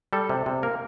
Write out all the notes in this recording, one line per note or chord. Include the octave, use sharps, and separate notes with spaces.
G3 A4
C3
C3
A#3 A#4